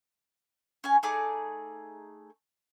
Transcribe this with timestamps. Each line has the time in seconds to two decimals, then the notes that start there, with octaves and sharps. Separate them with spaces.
0.84 C#4 G#5
1.03 A3 D#4 G#4 D6